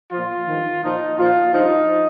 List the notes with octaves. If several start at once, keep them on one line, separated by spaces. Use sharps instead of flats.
A#2 F3 F4
G2 D#3
A#2 F3 D#4
A#2 F3 F4
G2 F3 D#4